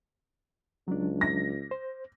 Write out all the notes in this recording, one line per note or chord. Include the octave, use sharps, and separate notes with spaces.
C#2 F#3 D4
A#6
C5